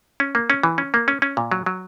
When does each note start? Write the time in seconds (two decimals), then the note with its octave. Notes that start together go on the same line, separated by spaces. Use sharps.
0.20 C#4
0.35 A#3
0.50 C#4
0.63 E3
0.78 C#4
0.94 A#3
1.08 C#4
1.22 C#4
1.37 A#2
1.51 F#3
1.66 F#3